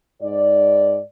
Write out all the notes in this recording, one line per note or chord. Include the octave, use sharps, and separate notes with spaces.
G#2 D5